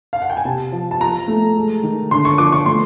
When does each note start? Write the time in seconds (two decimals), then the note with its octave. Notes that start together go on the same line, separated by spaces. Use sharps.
0.13 F5
0.22 F#5
0.30 G5
0.37 G#5
0.45 C3 A5
0.72 F3
0.91 A5
1.00 F3 A#5
1.28 A3
1.56 G#3
1.83 D#3
2.11 D3 C6
2.25 C#6
2.38 F3 D6
2.52 C#6
2.66 A3 C6